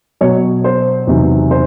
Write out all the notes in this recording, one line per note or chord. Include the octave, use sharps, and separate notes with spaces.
B2 F#3 C#5
C5
E2 C3 D#3 F#3
C5